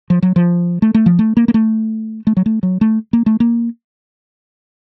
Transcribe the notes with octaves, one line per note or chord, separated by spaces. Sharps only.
F3
F#3
F3
A3
A3
F3
A3
A#3
A#3
A3
A3
F#3
A3
F#3
A3
A#3
A3
A#3